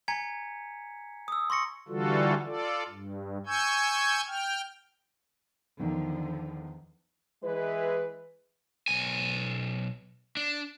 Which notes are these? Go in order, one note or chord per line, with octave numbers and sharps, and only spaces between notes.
G#5 A#5 G#6 B6 C#7
D#6 E6
C6 C#6 A#6 C#7
D3 E3 G3 F4 F#4 A4
F4 A4 D5
G2
G#5 C#6 E6 G6 G#6
G5 F6
E2 D3 D#3 F3
E3 G#3 E4 G#4 B4
B1 G#5
D4